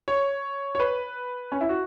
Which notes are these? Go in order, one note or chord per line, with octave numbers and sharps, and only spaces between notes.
C#5
C#5
B4
C#4
E4
F#4